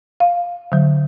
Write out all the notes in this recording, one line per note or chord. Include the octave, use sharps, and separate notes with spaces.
F5
D3 F#3